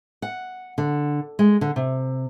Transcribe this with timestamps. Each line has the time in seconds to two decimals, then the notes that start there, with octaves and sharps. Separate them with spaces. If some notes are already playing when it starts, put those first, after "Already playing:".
0.22 F#5
0.78 D3
1.39 G#3
1.61 D3
1.76 C3